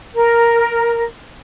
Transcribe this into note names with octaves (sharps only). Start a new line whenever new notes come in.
A#4